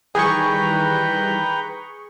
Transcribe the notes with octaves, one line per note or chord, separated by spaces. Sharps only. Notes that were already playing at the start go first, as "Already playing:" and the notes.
D#3 E3 G3 G#4 B4 G5 A#5 C#6